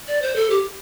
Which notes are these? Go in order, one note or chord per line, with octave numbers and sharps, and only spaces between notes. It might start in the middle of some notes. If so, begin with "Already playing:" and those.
D5
C5
A4
G4